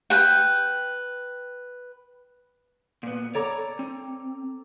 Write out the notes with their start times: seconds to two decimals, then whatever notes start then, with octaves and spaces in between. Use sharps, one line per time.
0.10 B4 G5
3.03 A#2 B3
3.35 A4 C#5 D5 A#5 D6
3.79 C4